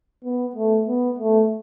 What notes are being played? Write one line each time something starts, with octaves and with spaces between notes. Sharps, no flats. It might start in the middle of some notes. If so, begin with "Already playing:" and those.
B3
A3
B3
A3